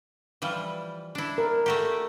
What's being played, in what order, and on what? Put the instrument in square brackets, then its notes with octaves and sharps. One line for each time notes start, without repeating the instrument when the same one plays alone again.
[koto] E3 F3 G3
D4 E4
[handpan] A#4
[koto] A3 F#4 G4